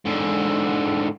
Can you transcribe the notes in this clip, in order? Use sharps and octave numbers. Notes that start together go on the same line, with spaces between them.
G#2 D3